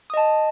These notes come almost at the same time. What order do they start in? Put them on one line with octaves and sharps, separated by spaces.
D#6 D#5 A5